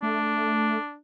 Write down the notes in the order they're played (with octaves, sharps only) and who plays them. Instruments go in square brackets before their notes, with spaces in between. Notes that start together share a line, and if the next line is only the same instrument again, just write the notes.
[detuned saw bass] A3 [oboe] D4